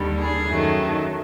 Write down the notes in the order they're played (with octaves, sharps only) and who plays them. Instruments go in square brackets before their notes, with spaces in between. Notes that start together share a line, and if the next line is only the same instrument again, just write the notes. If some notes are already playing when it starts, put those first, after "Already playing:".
Already playing: [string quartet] D#2 D3 G3
G#4
F#2 D#3 F#3 A3